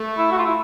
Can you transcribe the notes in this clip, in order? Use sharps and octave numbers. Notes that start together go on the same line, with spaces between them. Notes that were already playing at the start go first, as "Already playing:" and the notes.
Already playing: A3
E4
F#4
F4
E4